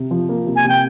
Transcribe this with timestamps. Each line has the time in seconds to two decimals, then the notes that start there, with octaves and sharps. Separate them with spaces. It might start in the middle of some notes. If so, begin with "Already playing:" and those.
Already playing: C3
0.11 F3
0.29 A#3
0.47 C3
0.56 G#5
0.64 C3 G5